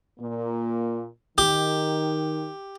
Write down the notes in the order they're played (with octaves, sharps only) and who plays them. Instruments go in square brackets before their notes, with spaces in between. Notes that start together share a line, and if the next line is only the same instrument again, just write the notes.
[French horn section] A#2 A#3
[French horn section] D#3 [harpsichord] G4